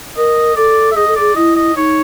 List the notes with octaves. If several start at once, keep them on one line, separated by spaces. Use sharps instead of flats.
A#4 D#5
A4 D5
E5
G#4 D#5
A4
G#4 D5
E4 D#5
D#5
D#4 C#5